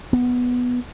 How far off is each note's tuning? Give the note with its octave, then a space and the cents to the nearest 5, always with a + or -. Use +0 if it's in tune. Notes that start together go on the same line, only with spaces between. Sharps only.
B3 +0